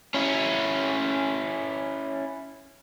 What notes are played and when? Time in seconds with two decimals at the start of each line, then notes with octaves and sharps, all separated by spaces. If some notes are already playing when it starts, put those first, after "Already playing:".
0.14 C#4 E4